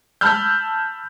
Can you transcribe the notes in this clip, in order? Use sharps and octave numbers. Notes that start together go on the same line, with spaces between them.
A5 B5 E6 F6 G6